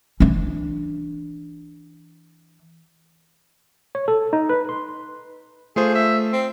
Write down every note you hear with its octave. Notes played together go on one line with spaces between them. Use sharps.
E3 D4
C#5
A4
D#4
B4
C6
A3 F4 G#4 C5
E5
C4